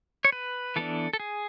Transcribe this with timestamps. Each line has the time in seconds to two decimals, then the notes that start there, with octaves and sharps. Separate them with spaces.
0.25 C#5
0.32 B4
0.76 E3 B3 D4 A4
1.13 A4
1.20 G#4